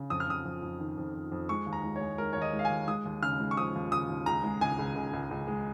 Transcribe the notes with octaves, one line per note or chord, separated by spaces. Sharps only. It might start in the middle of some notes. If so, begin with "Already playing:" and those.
Already playing: C#3
F2 D#6
F6
F2 D#6
F2
F2
D#3
F2
F2
F2
G#3 C#6
D#2
A#5
G#3
C#5
G#3
G#3 A#4
D#2 C#5
D#5
G#3
F5
G#5
D#2
G#3 D#6
D#2
C#3 F6
G#3
C#6
F3 D#6
D#2
C#3 D#6
D#2
C#2 A#5
G#3
C#2 G#5
C#2
C#2
C#2
C#2
G#3